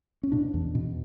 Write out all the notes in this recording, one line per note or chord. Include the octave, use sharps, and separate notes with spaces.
C#4
B2 D4
E2
B2